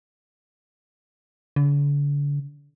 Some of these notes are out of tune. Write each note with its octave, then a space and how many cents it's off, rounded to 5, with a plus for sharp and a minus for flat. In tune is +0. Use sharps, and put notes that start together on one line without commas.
D3 -40